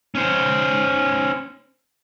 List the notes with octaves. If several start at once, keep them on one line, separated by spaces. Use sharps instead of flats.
C#4 C5